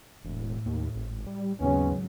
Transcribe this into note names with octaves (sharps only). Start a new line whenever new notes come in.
E1 A2
D#2
G#1
G3
G#1 D#2 C#3 F#3 G#3 B3 C#4